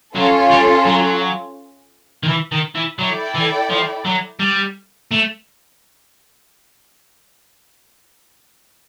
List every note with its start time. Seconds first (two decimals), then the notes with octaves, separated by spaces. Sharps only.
0.15 F#3 C#4 F4 A4
0.51 G3
0.86 F#3
2.23 D#3
2.28 E3
2.52 D#3
2.75 E3
2.99 F#3 E4 A4 D5 G5
3.35 E3
3.70 F3
4.05 F#3
4.40 G3
5.11 A3